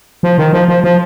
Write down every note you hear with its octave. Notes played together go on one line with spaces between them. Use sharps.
F3
D#3
F3
F3
F3